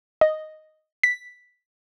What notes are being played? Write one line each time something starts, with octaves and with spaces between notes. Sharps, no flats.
D#5
B6